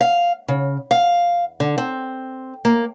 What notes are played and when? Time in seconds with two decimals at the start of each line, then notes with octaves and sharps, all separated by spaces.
0.01 F5
0.48 C#3
0.91 F5
1.60 D3
1.78 C4
2.65 A#3